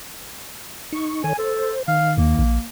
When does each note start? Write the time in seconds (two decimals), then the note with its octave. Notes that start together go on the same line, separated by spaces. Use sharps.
0.92 D#4 C#6
1.24 D#3 A4 C#5 G#5
1.38 A4 C5
1.88 D#3 F5
2.18 D#2 A#3
2.39 A#1